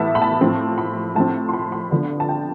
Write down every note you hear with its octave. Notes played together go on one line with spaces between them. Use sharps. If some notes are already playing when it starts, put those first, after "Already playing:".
Already playing: A2 E3 B3 E5 A5
B5
A5
A2 F3 C4
B5
A2 F3 C4 A5
C6
B5
B5
D3 F3 B3 D4
A5
G5